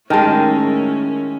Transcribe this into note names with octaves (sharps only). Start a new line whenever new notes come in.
A2 D#3 G#3 C#4 A#4 G5 A5